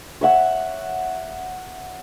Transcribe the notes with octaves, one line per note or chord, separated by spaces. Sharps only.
C#5 E5 F#5